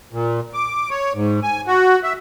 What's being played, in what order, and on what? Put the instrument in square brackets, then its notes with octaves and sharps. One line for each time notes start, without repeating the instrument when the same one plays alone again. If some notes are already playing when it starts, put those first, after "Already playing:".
[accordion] A#2
D6
C#5
G#2
G#5
F#4
E5